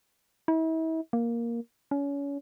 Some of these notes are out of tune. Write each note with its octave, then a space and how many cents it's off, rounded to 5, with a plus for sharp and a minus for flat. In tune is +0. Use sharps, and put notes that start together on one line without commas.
E4 -40
A#3 +5
C#4 +30